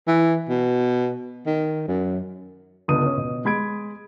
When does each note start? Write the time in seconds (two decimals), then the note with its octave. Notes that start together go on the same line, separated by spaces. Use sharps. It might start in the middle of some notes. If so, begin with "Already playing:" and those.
0.07 E3
0.49 B2
1.46 D#3
1.88 F#2
2.88 G1 C#2 D4 B4 D#6 D#7
3.06 C#4
3.17 B2
3.45 G#3 B5 G#6 D7